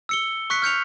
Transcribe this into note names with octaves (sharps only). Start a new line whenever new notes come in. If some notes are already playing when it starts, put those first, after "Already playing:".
E6 C#7 G7
C#6 F#6 B6 C#7
F6 G6 C#7 F7